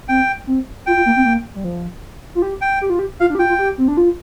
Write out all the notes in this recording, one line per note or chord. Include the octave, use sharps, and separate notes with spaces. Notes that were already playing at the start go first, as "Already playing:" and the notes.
C4 G5
C4
F4 G5
F4
A#3
C4
A#3
G3
F3
F4
G4
G5
G4
F4
G4
F4 F5
D4
G4
F4 G5
F4
G4
C4
D4
F4